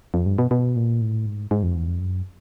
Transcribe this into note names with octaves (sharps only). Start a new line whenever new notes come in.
F2
G2
B2
B2
A#2
A2
G#2
G#2
F2
E2
F2
F#2